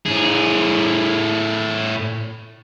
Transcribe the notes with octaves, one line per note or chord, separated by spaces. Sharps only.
A2 G#4